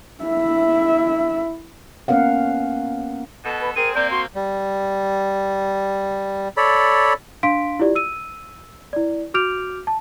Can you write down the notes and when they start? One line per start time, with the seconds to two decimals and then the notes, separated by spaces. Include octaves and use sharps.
0.24 E4 E5
2.08 A#3 B3 C#4 A#4 F5 F#5
3.45 B2 A4
3.60 B4
3.76 C4 G#4 A#4 D#7
3.95 A#3 C4 D5 G6
4.10 F#4 C6
4.35 G3
6.57 A4 C#5 D5 B5
7.43 D4 F5 C6 B6 D7
7.79 E4 F4 G4 D5
7.95 E6 D#7
8.93 E4 D5
9.34 F#4 D6 F6 G6 D7 F7
9.87 A5